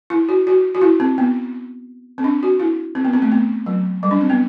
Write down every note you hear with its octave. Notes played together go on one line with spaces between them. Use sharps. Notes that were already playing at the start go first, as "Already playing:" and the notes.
E4
F#4
F#4
F#4
E4
C4
B3
C4
D4
F#4
E4
C4
B3
C4
A3
B3
F#3
G3
D4
C4
B3